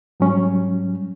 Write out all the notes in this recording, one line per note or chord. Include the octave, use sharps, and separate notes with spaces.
G#2 F#3 G3 C#4